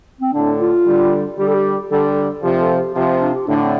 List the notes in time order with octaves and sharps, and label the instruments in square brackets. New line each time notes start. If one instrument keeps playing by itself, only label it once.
[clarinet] C4
[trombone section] A2 D3 [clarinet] D4
[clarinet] F4
[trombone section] D3 G3
[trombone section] D3 G3 [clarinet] G4
[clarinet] A4
G4
[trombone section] D3 G3 [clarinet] A4
[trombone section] C3 F3 [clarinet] G4
[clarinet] A4
G4
[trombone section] C3 F3 [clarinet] F4
[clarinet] D4
G4
[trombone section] A2 D3 [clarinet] D4
[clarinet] C4